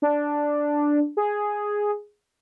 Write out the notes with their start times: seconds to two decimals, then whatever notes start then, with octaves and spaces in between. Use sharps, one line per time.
0.02 D4
1.17 G#4